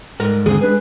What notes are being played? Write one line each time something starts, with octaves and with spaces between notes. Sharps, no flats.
G#2 A#4
D#2 D3 C4 G#4
G#3 D4 B4 G#5